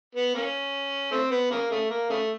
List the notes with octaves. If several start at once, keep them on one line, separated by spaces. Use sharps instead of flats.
B3
A#3 C#4
A3 C4
B3
C#3 A#3
C#3 A3
A#3
C#3 A3